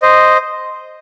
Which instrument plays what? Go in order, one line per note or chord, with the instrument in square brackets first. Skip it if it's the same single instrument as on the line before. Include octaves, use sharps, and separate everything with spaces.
[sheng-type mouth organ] C5 D#5